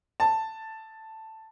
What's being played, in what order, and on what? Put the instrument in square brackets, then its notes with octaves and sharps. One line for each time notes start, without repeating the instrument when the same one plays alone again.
[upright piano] A5